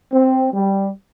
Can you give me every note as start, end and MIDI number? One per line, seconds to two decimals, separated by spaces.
0.12 0.48 60
0.52 0.89 55